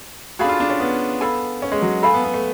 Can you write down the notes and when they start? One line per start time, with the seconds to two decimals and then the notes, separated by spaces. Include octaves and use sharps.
0.39 D4 F#4 G#4 A4 F5 B5
0.49 F4
0.60 D4
0.70 C#4
0.80 B3
1.21 A4 F5 G#5 B5
1.62 C#4
1.72 G#3
1.82 F#3
2.03 A3 A4 F5 G#5 B5
2.14 B3
2.24 B3
2.34 A3